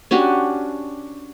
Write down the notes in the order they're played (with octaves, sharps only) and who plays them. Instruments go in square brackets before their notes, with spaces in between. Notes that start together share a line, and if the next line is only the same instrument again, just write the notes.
[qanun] C#4 D4 F#4 G4